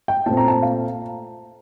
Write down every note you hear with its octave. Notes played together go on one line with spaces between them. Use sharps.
G5
A#2 A3 C4 A5
A#5
A5
F5